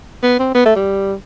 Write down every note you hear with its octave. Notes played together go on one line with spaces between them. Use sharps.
B3
C4
B3
A3
G3